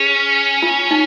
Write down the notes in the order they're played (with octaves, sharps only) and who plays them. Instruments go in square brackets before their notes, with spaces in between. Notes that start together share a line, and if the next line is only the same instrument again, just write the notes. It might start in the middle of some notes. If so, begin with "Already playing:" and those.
Already playing: [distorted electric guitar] C#4 [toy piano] G#4
[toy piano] F4
D#4